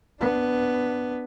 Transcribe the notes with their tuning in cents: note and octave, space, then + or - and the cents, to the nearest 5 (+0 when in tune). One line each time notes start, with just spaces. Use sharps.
B3 +5 D4 +0